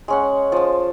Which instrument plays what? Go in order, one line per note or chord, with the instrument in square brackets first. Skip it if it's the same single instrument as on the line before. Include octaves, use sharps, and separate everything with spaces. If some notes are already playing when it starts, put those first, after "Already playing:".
[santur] G#3 C#4 F#5
F3 A5